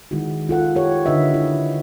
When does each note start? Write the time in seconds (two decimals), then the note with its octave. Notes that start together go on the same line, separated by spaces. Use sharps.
0.11 D#3 G#3 E4 F#4
0.49 F4 A4 F#5
0.75 G4 A#4 C#5
1.06 D3 D#4 B4 D#5 E5
1.34 E4